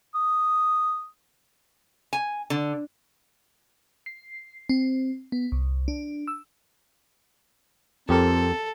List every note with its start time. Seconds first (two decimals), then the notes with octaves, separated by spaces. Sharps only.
0.15 D#6
2.13 G#5
2.50 D3
4.06 C7
4.69 C4
5.32 B3
5.52 C2
5.88 D4
6.28 E6
8.09 F2 C4 G4 A4 A#4